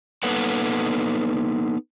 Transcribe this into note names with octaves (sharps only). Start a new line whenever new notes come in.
A#3 B3 D#4 A4 B4 F#5